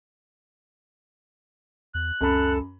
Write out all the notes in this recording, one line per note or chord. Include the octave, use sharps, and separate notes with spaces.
E2 F#6
C#2 F#2 A4 B5